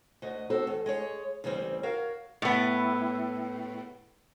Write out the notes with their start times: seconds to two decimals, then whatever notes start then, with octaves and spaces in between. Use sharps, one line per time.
0.22 D2 F#4 D#5
0.50 C4 F#4 A4
0.67 E2
0.86 G#3 G#4 C#5
1.44 D2 C#3 E3 G3 C4
1.83 F#4 A#4 C#5 F5
2.42 A2 B3